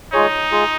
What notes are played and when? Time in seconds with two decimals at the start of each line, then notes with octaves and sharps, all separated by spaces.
0.12 G#3 D#4 F4 G#4 C#5
0.51 G#3 F4 G#4